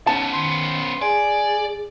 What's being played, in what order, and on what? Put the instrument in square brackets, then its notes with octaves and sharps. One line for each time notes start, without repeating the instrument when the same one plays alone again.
[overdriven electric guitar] B3 C#4 [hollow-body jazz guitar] A5
[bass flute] D#3 [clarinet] C6
[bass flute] G#4 [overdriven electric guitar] D5 [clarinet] G#5